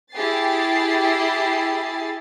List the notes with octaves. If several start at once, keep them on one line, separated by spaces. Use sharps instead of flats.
E4 G4 G#4 A6 C7